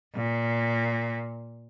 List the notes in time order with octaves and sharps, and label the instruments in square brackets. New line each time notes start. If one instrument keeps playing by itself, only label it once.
[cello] A#2